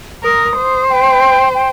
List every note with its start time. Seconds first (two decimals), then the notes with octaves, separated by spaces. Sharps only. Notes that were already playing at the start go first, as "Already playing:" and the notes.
0.24 A#4 D#6
0.57 C5
0.90 G5
1.55 G5